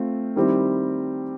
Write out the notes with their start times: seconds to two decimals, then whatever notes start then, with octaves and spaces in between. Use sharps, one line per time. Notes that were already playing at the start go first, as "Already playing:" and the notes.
Already playing: A3 C4 F4
0.36 D#3 G3 C4 E4 G4